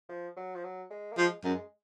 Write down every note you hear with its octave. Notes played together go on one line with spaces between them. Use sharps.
F3
F#3
F3
F#3
G#3
A#3
F3 G#3
F#2 G#3